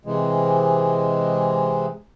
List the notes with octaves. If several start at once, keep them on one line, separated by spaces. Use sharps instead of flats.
C3 E3 G#3